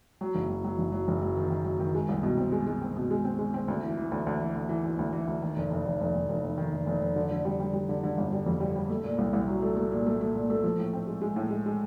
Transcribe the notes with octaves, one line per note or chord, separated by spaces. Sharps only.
F#3
F#1
F#3
F#3
F#1
F#3
F#1
F#3
D#3
D#3
F#3
D#3
G#3
C2
B2
C4
G#3
G#3
C4
B2
G#3
C4
G#3
C4
D2
E3
E3
D2
D2
E3
D2
E3
E3
D2
E3
D2
D#3
F1
F1
F1
F1
F1
F1
F1
D#3
F1
F1
F1
D3
D3
G3
G3
G3
D3
D3
G1
G3
F2
G3
G3
A3
A#2
C2
C2
F#3
A3
A3
A#2
A3
A3
A#2
A3
F3
A2
C4
G#3
G#3
A2
G#3
G#3